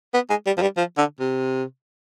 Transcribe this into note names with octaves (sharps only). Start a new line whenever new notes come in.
B3
G#3
G3
F3
G3
F3
D3
C3